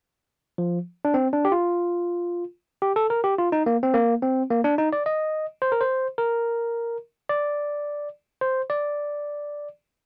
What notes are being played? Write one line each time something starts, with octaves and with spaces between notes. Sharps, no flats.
F3
D4
C4
D4
G4
F4
G4
A4
A#4
G4
F4
D#4
A#3
C4
A#3
C4
A#3
D4
D#4
D5
D#5
C5
A#4
C5
A#4
D5
C5
D5